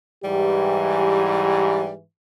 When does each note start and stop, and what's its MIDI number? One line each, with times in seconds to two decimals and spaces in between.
0.24 2.03 44
0.24 2.03 52
0.24 1.90 55
0.24 1.96 67